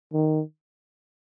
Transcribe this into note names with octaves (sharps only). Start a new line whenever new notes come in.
D#3